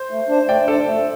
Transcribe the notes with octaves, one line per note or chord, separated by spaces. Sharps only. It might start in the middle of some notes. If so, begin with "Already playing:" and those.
Already playing: C5
A3
D4 C5
A3 D5 G5
D4 A4 C5 D5
A3